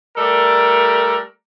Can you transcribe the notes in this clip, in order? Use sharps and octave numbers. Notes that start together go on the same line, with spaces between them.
G3 A3 A4 A#4 D5